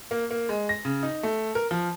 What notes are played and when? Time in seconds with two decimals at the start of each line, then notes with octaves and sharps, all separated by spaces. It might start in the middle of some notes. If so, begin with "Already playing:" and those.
0.11 A#3
0.31 A#3
0.49 G#3
0.69 A#6
0.85 C#3
1.03 D#4
1.23 A3
1.55 A#4
1.71 F3